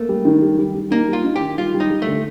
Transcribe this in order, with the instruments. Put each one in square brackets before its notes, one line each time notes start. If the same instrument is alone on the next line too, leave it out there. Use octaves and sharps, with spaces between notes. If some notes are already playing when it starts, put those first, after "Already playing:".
Already playing: [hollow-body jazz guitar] A3 [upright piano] A#3
[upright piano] G3
D#3
G3
G3
G3
[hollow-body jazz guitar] A#3 [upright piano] D#4
[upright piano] G3 [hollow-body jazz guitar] F4
[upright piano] D#4
[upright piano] D#3 [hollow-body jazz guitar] G4
[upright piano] G3 [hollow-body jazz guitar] F4
[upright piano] G3
[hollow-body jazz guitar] D#4
[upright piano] G3
[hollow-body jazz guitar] A3
[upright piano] D3